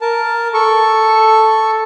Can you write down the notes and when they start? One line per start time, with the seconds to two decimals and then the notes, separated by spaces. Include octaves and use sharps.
0.01 A#4 A5
0.54 A4 C#6